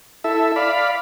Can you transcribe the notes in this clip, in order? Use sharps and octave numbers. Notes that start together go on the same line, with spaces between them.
E4 A4 E5
D5 F5 B5